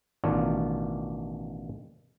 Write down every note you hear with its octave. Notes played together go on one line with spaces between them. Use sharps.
A1 B2 D#3 D4 F4 C#5